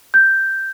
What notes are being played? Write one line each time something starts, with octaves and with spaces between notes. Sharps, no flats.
G6